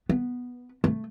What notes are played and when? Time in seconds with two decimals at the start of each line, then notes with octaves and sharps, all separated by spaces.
0.09 B3
0.84 A3